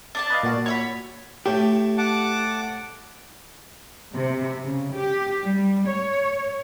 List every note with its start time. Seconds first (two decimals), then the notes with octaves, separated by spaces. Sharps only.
0.15 D4 D5 A5
0.30 B4 D#5 F5
0.43 A#2 F#4
0.66 C#5 E5 B5
1.46 A2 A3 G4
1.98 F#5 A5 D6
4.14 C3
4.64 C#3
4.94 G4
5.45 G3
5.88 C#5